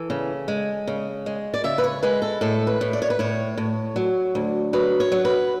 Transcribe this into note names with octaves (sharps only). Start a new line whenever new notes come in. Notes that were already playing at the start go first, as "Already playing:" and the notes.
Already playing: E3 A4
C#3
G#3
C#3
G#3
D5
C#3 E5
B4
C#5
G#3 B4
A4
A2 A4
B4
A2
D5
C#5
B4
A2 C#5
A2
F#3
D2
F#3 B4
C#5
F#3
B4